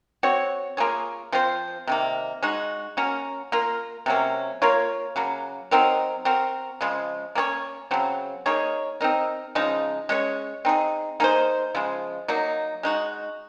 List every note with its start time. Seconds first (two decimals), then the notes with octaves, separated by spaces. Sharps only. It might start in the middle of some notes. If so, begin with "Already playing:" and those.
0.23 C4 F#4 C#5
0.77 A#3 F4 G#4 C#5
1.32 F3 C4 F4 C5
1.87 C3 D#3 A#3
2.43 G#3 D#4 F#4
2.97 A#3 C#4 F#4 A#4
3.52 A#3 F4 A#4
4.06 C3 F#3 A#3 C#4
4.62 A#3 F4 A#4 C#5
5.16 C#3 F#3 A#3
5.71 F#3 C4 D#4 A#4
6.25 C4 F#4 A#4
6.81 C#3 F3 G#3
7.35 A#3 C#4 G#4 C#5
7.91 C#3 F#3 C4
8.46 A#3 D#4 G#4 C#5
9.01 C4 D#4 A#4
9.55 C#3 F3 G#3 D#4
10.09 G#3 C#4 G#4 C#5
10.65 C4 D#4 G#4
11.20 A#3 D#4 G#4 C5
11.75 C#3 F3 G#3
12.28 F#3 A#3 D#4
12.83 G#3 D#4 F#4